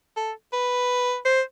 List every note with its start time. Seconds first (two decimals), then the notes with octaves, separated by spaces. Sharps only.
0.16 A4
0.53 B4
1.25 C5